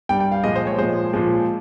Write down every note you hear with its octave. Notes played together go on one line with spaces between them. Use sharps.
G2 G3 G5
G5
F5
A#2 F3 G#3 D#5
C5
C#5
A#2 F3 G#3 C5
A#2 F3 G#3